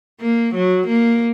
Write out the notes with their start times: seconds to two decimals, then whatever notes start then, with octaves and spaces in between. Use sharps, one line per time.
0.20 A#3
0.54 F#3
0.87 A#3